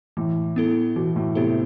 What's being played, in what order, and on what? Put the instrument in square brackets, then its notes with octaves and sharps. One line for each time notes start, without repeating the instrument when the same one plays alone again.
[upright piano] A2 [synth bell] E3
[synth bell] B3 E4 A4
[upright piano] B2 [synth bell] E3
[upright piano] A2
[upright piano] C3 [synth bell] B3 E4 A4